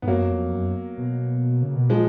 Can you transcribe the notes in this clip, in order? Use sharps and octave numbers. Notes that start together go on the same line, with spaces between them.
G#2 B3
F#2 F#3 A#3
F2
F#2
B2
C#3
B2
A#2 F3 G#3